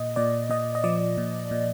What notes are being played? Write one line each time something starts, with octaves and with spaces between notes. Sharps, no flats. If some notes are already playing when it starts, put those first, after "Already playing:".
Already playing: A#2 D#5
A#2 D5
A#2 D#5
D#5
F3 D5
A#2
A#2